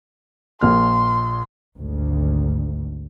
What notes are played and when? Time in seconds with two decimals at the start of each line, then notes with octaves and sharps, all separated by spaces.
0.61 A#1 A#2 C6 F6
1.78 G#1 D2